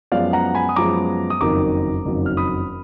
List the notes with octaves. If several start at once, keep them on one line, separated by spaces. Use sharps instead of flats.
F#2 F3 G#3 B3 D5 F5
F#5 A#5
G#5 B5
D#6
F#2 F3 G#3 B3 A#5 D6
D#6
F#1 F2 D#3 F#3 A#3 A#5 D6
F#1 F2 D#3 F#3 A#3
F6
B5 D#6